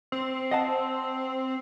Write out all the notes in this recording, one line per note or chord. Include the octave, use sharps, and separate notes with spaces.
C4
D#5 F#5 A5